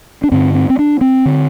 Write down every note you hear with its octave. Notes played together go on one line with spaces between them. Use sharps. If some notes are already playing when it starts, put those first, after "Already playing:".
D4
G2 D3 C4
C4
C4
D4
C4
D3